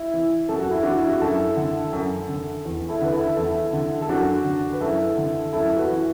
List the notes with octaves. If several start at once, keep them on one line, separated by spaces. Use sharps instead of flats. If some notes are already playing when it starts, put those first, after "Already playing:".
Already playing: E4
E3
F#2 A4
F#4
E4
E3 D4 F#4
E4
F#4
F#2 E4 A4
D3
F#2
D3
E2
E4 A4
D3 B4
E4 A4
E2 E4 A4
D3
A4
F#2 D4 F#4
D3
B4
F#2 E4 A4
D3
F#2 E4 A4
F#4 B4
E3